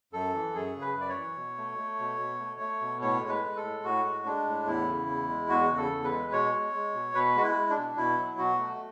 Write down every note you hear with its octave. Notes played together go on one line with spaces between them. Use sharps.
F#2 A4
E3
F#2 G#4
C#3
B4
F#2
D5
C#5
E3
B2
A3
A3
B2
B2
A3
A3
B2
A2 C#5
G#3
B4
G#3
A4
A2
A2 F#4
G#3
G#3 D4
A2
E2 E4
C#3
E2
G#3
E2 F#4
C#3
A4
E2
B4
G#3
B2 C#5
G#3
G#3
B2
B2 B4
G#3 F#4
E4
G#3
D4
B2
B2 E4
F#3
B2 F#4
A3